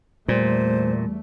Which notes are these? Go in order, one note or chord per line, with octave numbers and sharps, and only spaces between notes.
E2 A#2 G3 A3 C5